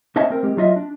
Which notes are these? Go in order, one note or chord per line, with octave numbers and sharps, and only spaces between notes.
C4 C#4 D#5 E5 G#5 A5
C4 A#4
G#3 G4
F#3 F4 D#5 E5
D4